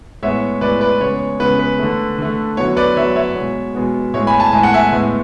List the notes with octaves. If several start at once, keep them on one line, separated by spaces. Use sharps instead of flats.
A2 G#3 B3 C#5 E5
A2 G#3 B3 B4 D5
B4 D5
C#3 G#3 B3 C#5
C#3 G#3 B3 B4
B4
D3 A3
D3 A3
D3 F#3 B3 C#5
B4 D5
D3 F#3 B3 C#5 E5
C#5 E5
B2 G#3 B3
B2 G#3 B3
A2 G#3 B3 C#5
G#5 B5
A5
A2 G#3 B3 G#5
F#5
E5 G#5
A2 G#3 B3